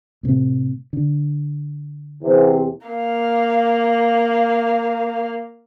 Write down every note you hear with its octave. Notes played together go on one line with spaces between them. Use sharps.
A2 C3 A3
D3
E2 C3
A#3 F5